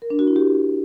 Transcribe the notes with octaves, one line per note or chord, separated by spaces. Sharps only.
A#4
D4
F#4
E4
G4